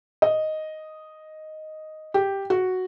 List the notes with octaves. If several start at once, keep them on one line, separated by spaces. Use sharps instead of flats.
D#5
G4
F#4